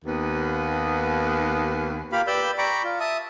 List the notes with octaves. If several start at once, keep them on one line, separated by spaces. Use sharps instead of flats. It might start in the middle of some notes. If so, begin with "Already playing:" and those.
D#2 B3
A#3 F4 G4 F5 B5
G4 B4 D5 B5 E6 G6
D5 G5 A#5 B5 C#6
F4
E5 A5 D#6